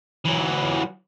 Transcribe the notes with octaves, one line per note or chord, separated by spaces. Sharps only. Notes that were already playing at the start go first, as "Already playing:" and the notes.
E3 F#3